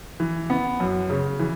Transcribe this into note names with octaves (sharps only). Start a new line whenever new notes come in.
E3
B3
F#2
C#3
E3